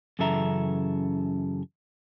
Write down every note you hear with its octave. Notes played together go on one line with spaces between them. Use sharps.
F#2 C#3 E3 A4 E5 A#5